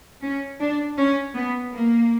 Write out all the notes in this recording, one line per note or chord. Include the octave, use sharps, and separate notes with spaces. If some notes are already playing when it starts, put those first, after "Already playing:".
C#4
D4
C#4
B3
A#3